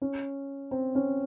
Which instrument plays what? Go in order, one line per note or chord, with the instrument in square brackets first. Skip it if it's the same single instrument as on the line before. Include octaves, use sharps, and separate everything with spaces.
[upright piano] C#4
C4
C#4